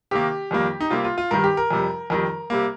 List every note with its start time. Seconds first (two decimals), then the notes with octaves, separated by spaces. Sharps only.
0.11 C3 D#3 A#3 G4
0.51 F2 D#3 G3 A#3
0.80 D#4
0.91 C3 G3 A#3 F4
1.04 F4
1.18 F4
1.31 G2 D#3 G3 A#4
1.44 G4
1.57 A#4
1.71 F2 C3 G3
2.10 F2 D#3 G3 A#4
2.50 C3 G3 A#3